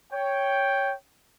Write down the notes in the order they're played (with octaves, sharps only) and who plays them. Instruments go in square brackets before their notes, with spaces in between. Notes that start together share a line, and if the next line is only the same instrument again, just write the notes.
[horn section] C#5 G5